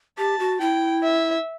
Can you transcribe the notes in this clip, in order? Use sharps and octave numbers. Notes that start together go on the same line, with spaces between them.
G4 A5
F#4
E4 G5
E5